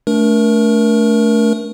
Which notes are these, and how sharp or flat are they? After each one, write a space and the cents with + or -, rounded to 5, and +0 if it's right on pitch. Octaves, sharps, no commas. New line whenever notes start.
A3 +0 D4 -30 A#4 +25